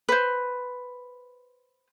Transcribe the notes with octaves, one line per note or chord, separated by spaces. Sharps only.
B4 C5